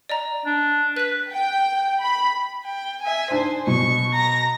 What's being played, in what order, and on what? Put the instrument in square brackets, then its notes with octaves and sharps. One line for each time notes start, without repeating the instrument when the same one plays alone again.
[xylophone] D5 D#5 A#5
[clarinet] D4
[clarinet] B4 [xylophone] F#6 B6
[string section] G5
B5
[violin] G5
E5 G#5
[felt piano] D4 D#4 [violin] C5
[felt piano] B2 F#3 [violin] C#6
[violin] A#5 A#6